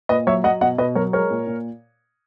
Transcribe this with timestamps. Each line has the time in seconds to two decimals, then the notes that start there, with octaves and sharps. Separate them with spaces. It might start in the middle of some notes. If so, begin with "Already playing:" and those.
0.09 A#2 B4 D#5
0.27 F#3 C#5 E5
0.44 F#3 D#5 F#5
0.61 B2 D#5 F#5
0.78 B2 B4 D#5
0.95 F#3 A#4 C#5
1.13 G#3 A#4 C#5
1.30 A#2
1.47 A#2